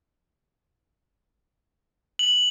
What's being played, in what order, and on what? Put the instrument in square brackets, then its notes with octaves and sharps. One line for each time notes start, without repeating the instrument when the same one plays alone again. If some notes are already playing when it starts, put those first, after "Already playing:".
[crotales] F#7